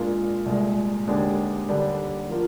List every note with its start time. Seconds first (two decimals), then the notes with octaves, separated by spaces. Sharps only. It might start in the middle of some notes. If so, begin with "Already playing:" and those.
Already playing: A#2 G#3 D4 F4 A#4
0.46 C2 A#2 G#3
1.07 D#2 D3 G#3 D4 G4
1.68 D#2 D3 G3 D4
2.29 F3 A#3 F4 A#4